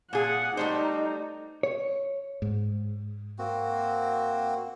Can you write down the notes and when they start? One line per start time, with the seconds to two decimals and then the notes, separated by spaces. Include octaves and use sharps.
0.13 A#2 G#4 F#5
0.57 G3 A3 D#4 C5
1.63 C#5
2.42 G#2
3.39 A#3 C4 F#4